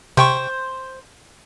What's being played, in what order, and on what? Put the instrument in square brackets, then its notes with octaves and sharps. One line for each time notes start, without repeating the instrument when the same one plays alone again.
[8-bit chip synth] C3 G5 C#6 [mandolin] C5